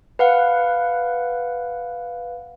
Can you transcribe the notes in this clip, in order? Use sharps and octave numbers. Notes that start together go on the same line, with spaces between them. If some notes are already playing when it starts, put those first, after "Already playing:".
B4 F5 F#5